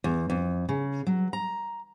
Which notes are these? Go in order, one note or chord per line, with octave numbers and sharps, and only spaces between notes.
E2
F2
C#3
F#3
A#5